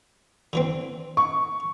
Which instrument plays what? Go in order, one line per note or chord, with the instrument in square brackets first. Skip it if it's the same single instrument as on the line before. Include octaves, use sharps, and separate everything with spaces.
[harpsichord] D3 E3 C4
[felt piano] C#6